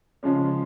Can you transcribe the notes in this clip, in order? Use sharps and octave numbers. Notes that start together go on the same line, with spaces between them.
C#3 F3 G#3 C#4